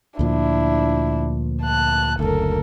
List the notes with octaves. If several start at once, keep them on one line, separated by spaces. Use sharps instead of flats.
D2 A#2 F3 D4 E4
A5 F#6
F#1 D2 A4 A#4